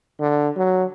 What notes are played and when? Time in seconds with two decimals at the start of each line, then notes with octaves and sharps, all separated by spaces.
0.20 D3
0.56 F#3